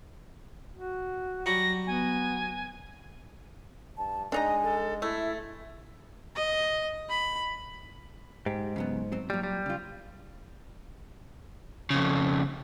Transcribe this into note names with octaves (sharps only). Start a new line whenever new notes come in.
F#4
F#3 G3 F#5 A#6
B3 G#5
G2 A5
G#3 D4 D#4 D#5 G#5 A#5
A4
A3 E4 E5
D#5
B5
G#2 G4
C#3 F#3 B3
F#3 C4
A#2 F#3 G3
G3
C#3 F4
F2 C#3